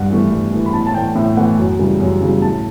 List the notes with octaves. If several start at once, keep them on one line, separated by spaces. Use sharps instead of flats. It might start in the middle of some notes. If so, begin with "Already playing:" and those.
Already playing: G2 F#5
E3 A3
G2
E3 A3
B5
A2 A5
A5
E3 A3 G5
A2 E5
E3 A3 F#5
F#2
C#3 E3 G3
F#2
C#3 E3 G3
A2 A5